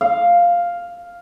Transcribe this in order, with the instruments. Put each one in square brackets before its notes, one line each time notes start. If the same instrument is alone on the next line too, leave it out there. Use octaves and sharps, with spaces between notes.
[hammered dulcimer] F5